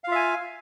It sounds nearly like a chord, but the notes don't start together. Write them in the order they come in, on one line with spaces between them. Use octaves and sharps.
F5 F4 E5 G#5